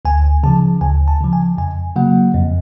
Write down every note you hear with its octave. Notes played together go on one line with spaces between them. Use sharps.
D2 G#5
C#3 F3 A5
D2 G#5
A5
C#3 F3
G#5
F2 G#5
C#3 F#3 A#3 F#5
F2